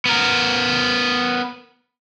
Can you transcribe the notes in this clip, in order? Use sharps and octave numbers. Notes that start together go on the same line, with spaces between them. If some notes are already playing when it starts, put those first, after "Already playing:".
B3 A#4